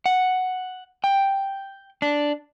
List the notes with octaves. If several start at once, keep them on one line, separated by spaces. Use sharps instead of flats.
F#5
G5
D4